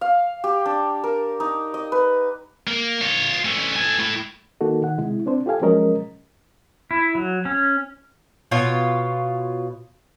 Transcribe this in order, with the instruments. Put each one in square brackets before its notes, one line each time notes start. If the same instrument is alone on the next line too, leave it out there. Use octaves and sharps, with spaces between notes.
[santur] F5
G4
D4
A#4
D#4
D#5
B4
[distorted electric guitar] A#3
F4 C#5
A3 C#4
A4 G#5
A3 E4
[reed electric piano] D#3 A#3 D#4 F#4 A4
D#3 F#5
C3 G#3 E4
C4 D4 C5
F4 G4 A4 F5 G#5
F3 F#3 G#3 C#4 A#4 D#5
[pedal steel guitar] E4
F#3
C#4
[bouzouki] B2 F4 C#5